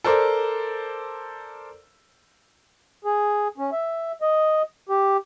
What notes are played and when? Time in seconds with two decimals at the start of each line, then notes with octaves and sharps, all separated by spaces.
0.04 A4 A#4 C5 D5
3.05 G#4
3.58 C#4
3.72 E5
4.22 D#5
4.89 G4